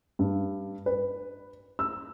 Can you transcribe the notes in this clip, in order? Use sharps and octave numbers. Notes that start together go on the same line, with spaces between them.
G2
B4
E6